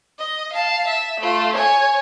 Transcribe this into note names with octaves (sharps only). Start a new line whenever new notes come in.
D#5
F5 A5
E5
A3 F4
C#5 G#5